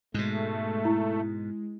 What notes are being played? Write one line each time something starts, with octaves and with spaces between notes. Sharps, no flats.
G#2 B2 G#3 A3
E4